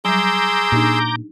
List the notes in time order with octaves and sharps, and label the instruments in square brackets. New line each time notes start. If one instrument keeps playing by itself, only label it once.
[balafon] F#3 G3 [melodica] G#4 C6 E6 [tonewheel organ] A#5 D6 G6
[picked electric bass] A#2 [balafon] D4 D#4 G4